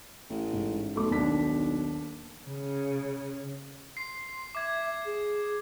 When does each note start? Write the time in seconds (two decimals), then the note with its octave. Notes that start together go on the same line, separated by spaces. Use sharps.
0.30 A1
0.53 G#2
0.96 B1 A3 D6
1.10 D#2 D4 B6
2.47 C#3
3.97 C6 C7
4.55 E5 D6 G#6
5.05 G#4